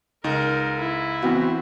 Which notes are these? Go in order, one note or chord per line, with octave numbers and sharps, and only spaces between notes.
C#2 D#4 A#4
E4
E3 B3 C4 F#4